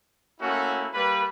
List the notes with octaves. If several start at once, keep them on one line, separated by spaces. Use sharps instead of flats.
A3 A#3 C#4 E4 F#4
G3 A#3 B4